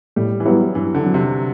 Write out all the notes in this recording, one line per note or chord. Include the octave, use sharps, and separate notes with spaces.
A2 G3
E3
F#3 G3 B3 E4 G4
G2 E3
D3
F#3 C4
C3